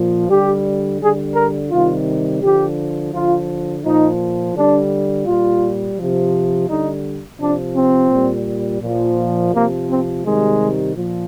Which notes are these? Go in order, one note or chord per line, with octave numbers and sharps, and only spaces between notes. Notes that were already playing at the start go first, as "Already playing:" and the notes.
Already playing: A#2 F3
D3 G3 G4
D3 G3 G#4
A#4
C3 D#3 G3 F4
D3 F3 G4
D3 F3 F4
A#2 F3 D#4
D3 G3 D4
A#2 G3 F4
C3 F3
D3 G3 D#4
C3 F3 D4
C4
A#2 G3
A#2 F3
C3 F3 A#3
C4
C3 D#3 G3 G#3
A#2 F3